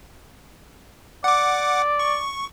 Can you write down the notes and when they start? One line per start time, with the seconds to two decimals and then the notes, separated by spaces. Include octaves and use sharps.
1.24 D5 F#5 D6
1.99 C#6